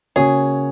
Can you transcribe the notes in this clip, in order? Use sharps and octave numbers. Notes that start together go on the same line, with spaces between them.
C#3 A#3 F#4 G#4 C#5